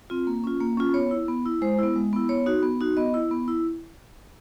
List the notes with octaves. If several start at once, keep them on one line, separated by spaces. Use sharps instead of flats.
C4 F4
A#3
C#4 F4
A#3
C#4 F4
B3 C#5
E4
B3
E4
G#3 C5
B3 E4
G#3
B3 E4
B3 C#5
D#4 F#4
B3
D#4 F#4
B3 D#5
E4
B3
E4